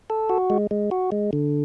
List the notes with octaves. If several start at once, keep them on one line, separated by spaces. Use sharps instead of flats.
A4
F#4
G#3
G#3
F#4
G#3
D3